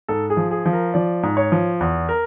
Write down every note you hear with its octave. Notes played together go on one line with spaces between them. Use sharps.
G#2 A4
G#4
F3
G#4
F3
A#4
F3 D5
G#2
C#5
F3
E2
A#4